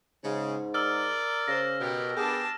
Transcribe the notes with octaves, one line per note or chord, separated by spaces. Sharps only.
G#2 C#3 G#3
A#4 D5 E6 F6
C#3 C5 A#6
B2 G4 A#4
B3 D4 G4 G#4 A5